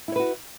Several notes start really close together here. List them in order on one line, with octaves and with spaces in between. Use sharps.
E4 C#5 B4 F#4